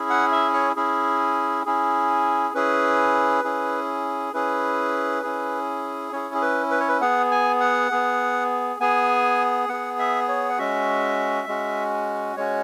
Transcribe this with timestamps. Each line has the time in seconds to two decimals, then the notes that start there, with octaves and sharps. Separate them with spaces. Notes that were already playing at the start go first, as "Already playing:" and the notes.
Already playing: C#4 E4 G#4
0.10 F#5
0.32 E5
0.53 C#5
0.76 C#4 E4 G#4
1.66 C#4 E4 G#4
2.54 C#4 E4 G#4 B4
3.44 C#4 E4 G#4
4.34 C#4 E4 G#4 B4
5.23 C#4 E4 G#4
6.12 C#4 E4 G#4 C#5
6.34 G#4
6.42 B4
6.71 B4
6.80 C#5
6.89 B4
7.01 B3 G#4 F#5
7.31 G#5
7.60 F#5
7.91 B3 G#4
8.80 B3 G#4 G#5
9.69 B3 G#4 F#5
9.99 E5
10.28 C#5
10.49 F#5
10.58 G#3 C#4 F#4 E5
11.47 G#3 C#4 F#4
12.37 G#3 C#4 F#4 C#5